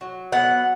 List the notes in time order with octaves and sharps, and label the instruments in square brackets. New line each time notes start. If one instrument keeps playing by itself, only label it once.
[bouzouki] F#3
B3 F#5